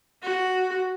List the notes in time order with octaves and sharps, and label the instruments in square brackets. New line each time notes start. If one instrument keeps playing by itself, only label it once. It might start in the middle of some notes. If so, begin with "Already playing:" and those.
[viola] F#4